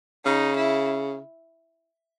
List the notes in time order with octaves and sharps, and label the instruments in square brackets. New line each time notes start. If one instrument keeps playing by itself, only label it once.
[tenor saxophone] C#3 [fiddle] D#4
[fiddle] E4